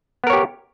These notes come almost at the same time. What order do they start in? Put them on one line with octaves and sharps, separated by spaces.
B3 A#4 C#5 G4